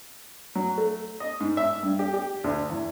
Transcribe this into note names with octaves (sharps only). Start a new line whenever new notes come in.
F#3
A3
D#5
G#2
E5
G2
G4
G4
D2
E2